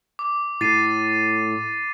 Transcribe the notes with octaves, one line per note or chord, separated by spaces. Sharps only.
D6
A2 A6 C7 D#7